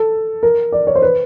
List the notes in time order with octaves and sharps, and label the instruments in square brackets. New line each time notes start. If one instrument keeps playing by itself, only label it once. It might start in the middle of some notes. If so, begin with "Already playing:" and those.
Already playing: [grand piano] A4
A#4
D5
C#5
C5
B4